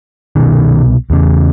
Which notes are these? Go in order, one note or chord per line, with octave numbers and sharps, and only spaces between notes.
C2 B2 D#3
E2 C#3